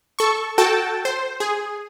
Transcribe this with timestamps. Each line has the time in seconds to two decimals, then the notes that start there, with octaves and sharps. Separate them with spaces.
0.19 A4 C#6
0.58 F#4 A4 G5 A5
1.05 C5
1.40 G#4